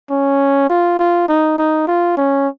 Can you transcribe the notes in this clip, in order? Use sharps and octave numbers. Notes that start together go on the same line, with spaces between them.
C#4
F4
F4
D#4
D#4
F4
C#4